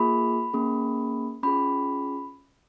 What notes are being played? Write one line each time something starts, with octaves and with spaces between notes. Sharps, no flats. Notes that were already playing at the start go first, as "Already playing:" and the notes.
Already playing: A#3 F4 G#4 B5
A#3 C#4 G#4
C#4 F4 G#4 B5